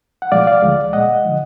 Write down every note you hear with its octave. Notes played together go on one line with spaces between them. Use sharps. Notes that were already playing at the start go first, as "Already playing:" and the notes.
F#5
A#2 F3 G#3 D5 F5
D5 F5
D2 D3 F3 G#3
A#2 G#3 D#5 F#5
D3 F3